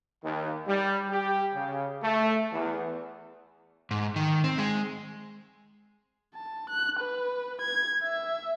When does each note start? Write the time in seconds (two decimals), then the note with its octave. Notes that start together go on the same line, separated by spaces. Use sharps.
0.23 D#2
0.67 G3
1.10 G4
1.53 C#3
2.03 A3
2.52 E2
3.91 G#2
4.16 D#3
4.44 C4
4.58 G#3
6.35 A5
6.70 F#6
7.00 B4
7.62 G#6
8.04 E5